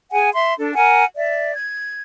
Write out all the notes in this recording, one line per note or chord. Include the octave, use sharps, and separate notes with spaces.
G#4 F#5 G#5
E5 C6
D4 A4
A#4 F#5 G#5
D5 E5
G#6